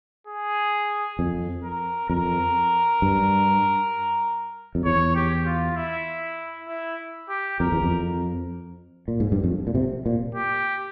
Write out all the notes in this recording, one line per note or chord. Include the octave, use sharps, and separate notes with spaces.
G#4
F2
A#4
F2 A#4
G2
F2
E2 C#5
G4
F4
E4
E4
G4
F2 A#4
E2
F2
A#2
G#2
G2
F2
A#2
C3
A#2
G4